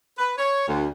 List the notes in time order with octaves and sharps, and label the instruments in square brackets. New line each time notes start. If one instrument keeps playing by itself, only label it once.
[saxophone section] B4
C#5
D2